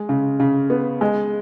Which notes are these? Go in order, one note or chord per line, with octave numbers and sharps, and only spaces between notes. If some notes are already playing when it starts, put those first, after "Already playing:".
Already playing: G#3
C#3
C#3
B3
G#3